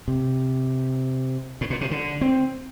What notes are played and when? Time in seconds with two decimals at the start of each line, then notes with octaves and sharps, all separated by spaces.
0.08 C3
1.61 A2
1.70 A#2
1.81 C3
1.91 D3
2.21 C4